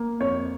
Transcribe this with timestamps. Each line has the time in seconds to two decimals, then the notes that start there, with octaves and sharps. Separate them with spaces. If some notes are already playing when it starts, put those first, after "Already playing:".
Already playing: A#3
0.20 F2 C#5